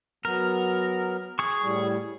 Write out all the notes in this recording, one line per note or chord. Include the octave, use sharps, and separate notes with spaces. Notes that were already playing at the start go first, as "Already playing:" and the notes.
F#3 B3 A#4
G#4 C#6
A2 G3